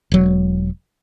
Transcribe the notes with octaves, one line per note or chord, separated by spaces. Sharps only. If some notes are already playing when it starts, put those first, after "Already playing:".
E1 F#3